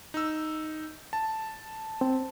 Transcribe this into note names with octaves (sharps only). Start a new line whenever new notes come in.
D#4 E6
A5
C4